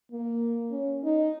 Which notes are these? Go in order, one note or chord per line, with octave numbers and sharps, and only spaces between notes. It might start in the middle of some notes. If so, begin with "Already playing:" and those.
A#3
C#4
D#4